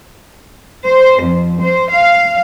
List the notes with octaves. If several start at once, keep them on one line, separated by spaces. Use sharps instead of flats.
C5
F2
C5
F5